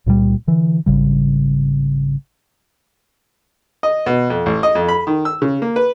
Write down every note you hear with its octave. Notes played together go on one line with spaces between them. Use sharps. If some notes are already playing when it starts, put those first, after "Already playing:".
C#2 A#2 F3 G3
D3 E3
G#1 C#3 G3
D#5
B2
F2
A1
D#5
F2
B5
D#3
E6
C#3
A#3
B4